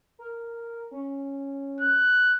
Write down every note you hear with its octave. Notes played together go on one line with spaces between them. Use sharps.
A#4
C#4
F#6